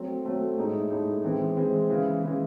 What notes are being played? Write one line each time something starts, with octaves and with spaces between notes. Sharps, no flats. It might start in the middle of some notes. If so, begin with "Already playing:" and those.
Already playing: F#3 A3 C4
F#3 A3 C4
A2 G#3 D#4
A2 G#3 D#4
E3 G#3 C4
E3 G#3 C4
C#3 E3 G#3
C#3 E3 G#3